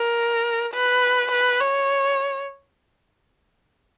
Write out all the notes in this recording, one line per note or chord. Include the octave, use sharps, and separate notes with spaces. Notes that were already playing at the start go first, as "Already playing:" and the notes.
Already playing: A#4
B4
B4
C#5